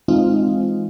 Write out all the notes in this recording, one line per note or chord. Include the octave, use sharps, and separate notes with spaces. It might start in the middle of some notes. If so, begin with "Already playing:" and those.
E3 G#3 C4 D#4 F4